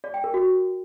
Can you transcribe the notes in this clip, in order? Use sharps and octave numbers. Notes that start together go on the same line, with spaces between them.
D5
G5
A#4
F#4